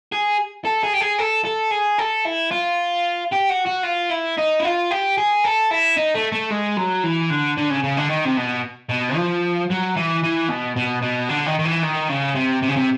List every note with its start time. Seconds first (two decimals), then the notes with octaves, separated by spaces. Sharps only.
0.12 G#4
0.65 A4
0.84 G#4
0.94 G4
1.01 G#4
1.19 A4
1.45 A4
1.72 G#4
1.99 A4
2.25 E4
2.51 F4
3.32 G4
3.50 F#4
3.67 F#4
3.85 F4
4.11 E4
4.38 D#4
4.60 E4
4.65 F4
4.91 G4
5.18 G#4
5.44 A4
5.71 E4
5.97 D#4
6.15 A3
6.32 A3
6.51 G#3
6.77 F#3
7.04 E3
7.30 D3
7.57 D3
7.70 C#3
7.84 C#3
7.97 D3
8.10 D#3
8.25 C3
8.37 B2
8.89 B2
9.16 F3
9.70 F#3
9.96 E3
10.23 E3
10.49 B2
10.76 B2
11.02 B2
11.29 D3
11.46 D#3
11.59 D#3
11.65 E3
11.83 D#3
12.09 C#3
12.35 C3
12.62 C3
12.68 C#3
12.76 C3